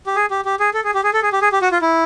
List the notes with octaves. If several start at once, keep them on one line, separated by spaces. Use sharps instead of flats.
G4
G#4
G4
G4
G#4
A4
G#4
G4
G#4
A4
G#4
G4
G#4
G4
F#4
F4
E4